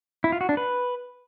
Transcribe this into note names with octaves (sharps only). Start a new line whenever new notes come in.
E4
F4
F#4
D4
B4